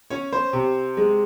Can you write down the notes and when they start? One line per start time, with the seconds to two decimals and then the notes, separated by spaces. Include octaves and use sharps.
0.10 C#4 C#5
0.33 C5
0.53 C3
0.97 G#3